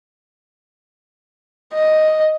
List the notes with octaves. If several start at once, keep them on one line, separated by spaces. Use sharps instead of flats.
D#5